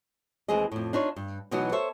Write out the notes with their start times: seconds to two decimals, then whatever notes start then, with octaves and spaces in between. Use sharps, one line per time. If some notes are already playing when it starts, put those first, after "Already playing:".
0.48 D#2 E3 G#3 C4 G#4 D#5
0.72 F2 A2
0.93 D4 D#4 F4 C#5
1.16 G2
1.51 B2 E3 F#3 B3 D#4
1.72 A4 C5 C#5 E5